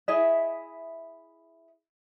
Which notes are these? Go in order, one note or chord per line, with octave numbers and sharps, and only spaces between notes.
E4 G#4 D#5 E5